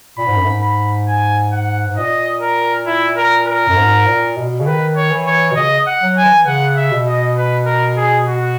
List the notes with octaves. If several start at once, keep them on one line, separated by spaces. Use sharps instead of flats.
A#2 B5
G#2
F#2
G#2
B5
G#5
F#5
G#2
A#2 D#5
A#4
E4
A#4
A#4
F#2
G#2
A#2
B2
C#3
D#3 B4
C#5
E3
C#5
B2
C#3 D#5
F#5
F#3
G#5
E3
C#3 F#5
E5
B2
D#5
B4
A#4
G#4
F#4